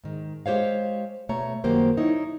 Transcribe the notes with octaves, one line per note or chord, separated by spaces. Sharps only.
G#2 D#3
G#3 G4 C5 C#5 F5
B2 A3 C#5 A#5
F#2 D#3 F#3 A#3 G4 C5
D#4 E4 C#5